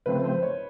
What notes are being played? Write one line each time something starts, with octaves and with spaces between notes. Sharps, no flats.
C#3 F3 A3 C4 B4
C5
C#5